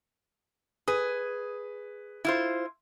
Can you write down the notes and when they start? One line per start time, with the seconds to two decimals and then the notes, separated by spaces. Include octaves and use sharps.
0.88 G#4 B4 D#6
2.25 E4 F4 C5